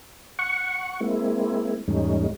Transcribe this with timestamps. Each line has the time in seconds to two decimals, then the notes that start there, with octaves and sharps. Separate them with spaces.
0.39 F#5 C#6
1.00 G#3 A#3 C4 E4
1.88 E2 G#2 G3 A3 C#4 D#4